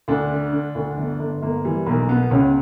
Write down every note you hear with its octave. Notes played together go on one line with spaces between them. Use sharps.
D2 D4
D3
D3
D2
G1
G1
G1 A#3
E3 G3
B1 A#3
B2 B3
C#2 C#4